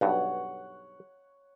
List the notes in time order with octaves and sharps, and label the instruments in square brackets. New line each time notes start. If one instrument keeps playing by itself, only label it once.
[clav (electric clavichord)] B1 G2 [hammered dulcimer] C#5 F#5